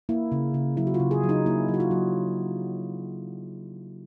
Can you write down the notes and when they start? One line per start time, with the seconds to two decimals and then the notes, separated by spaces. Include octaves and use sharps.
0.09 A#3 E4
0.32 C#3
0.54 C#3
0.77 F#3 E4
0.87 F#4
0.94 F4
1.00 C#3
1.11 G#4
1.24 F#3
1.29 D#4
1.46 A#3 E4
1.69 F#3
1.74 F#4
1.80 F4
1.91 F#3